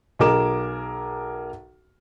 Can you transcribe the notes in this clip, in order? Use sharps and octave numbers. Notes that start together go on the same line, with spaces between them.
B1 G#4 A#4 D6 E7